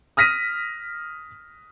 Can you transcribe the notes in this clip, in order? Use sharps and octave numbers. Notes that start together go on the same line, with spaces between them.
D#6 F6 A#6 B6 D#7